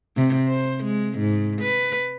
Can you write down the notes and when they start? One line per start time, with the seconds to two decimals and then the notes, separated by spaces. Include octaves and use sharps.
0.16 C3
0.48 C5
0.84 G#3
1.18 G#2
1.62 B4